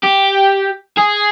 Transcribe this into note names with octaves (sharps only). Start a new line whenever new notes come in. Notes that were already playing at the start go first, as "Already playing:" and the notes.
G4
G#4